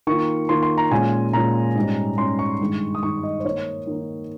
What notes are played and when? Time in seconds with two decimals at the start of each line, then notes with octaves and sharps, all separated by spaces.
0.07 D#3 A#3 F4 C#6
0.49 D#3 A#3 F4 C6
0.63 C6
0.78 A#5
0.91 A#2 G#3 C#4 F4 G#5
1.33 A#2 G#3 C#4 F4 A#5
1.75 G#2 G3 C#4
2.18 G#2 G3 C#4 C6
2.39 C#6
2.61 G2 D#3 G#3
2.95 D#6
3.03 G2 D#3 G#3 C#6
3.23 D#5
3.40 C5
3.45 D#3 A#3 D#4 C#5
3.87 D#3 A#3 D#4